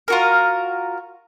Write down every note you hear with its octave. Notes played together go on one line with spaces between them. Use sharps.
F4 F#4 A#4